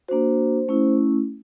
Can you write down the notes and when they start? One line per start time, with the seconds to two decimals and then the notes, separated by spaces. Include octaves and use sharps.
0.08 A#3 D4 F#4 C5
0.68 A3 C#4 E4